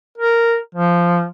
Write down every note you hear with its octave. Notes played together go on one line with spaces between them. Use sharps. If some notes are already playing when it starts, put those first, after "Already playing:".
A#4
F3